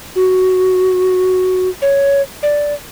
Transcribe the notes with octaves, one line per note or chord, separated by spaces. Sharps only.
F#4
C#5
D5